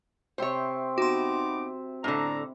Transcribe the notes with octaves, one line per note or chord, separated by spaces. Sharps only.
C3 C4 C5 C#5 E5
B3 D#4 F#4 C6 D6
A2 D3 D4 A#5